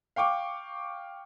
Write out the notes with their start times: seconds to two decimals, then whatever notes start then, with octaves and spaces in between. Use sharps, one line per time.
0.16 F5 G5 C#6 D6